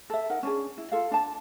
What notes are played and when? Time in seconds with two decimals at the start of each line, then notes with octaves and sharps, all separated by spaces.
0.10 A4 E5
0.30 D#4 A#4 F#5
0.43 C#4 D4 G#4
0.78 E4
0.92 F4 A4 F5
1.11 D4 A5